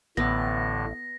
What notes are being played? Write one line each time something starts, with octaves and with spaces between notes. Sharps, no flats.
A1 A2 D3 B3 A#6